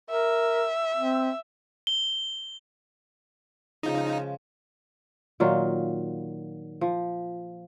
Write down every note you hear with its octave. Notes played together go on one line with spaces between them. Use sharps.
A#4 E5
C4
G7
C#3 F3 G#3 D#4
A#2 D#3 F#3 F4
F3